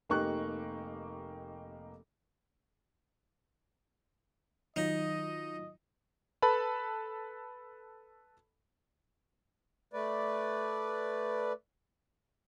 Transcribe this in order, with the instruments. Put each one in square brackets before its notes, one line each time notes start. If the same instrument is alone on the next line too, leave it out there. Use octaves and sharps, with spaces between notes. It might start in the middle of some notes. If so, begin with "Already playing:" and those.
[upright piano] F1 A#3 D#4 G4 C#6 F#6
[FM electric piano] D#3 F#3 F4 [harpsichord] D#4 [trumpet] D#5
[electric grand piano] A4 B4 A5 B5
[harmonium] A3 B4 D5